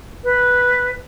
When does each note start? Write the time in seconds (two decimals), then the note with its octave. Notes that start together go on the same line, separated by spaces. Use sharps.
0.24 B4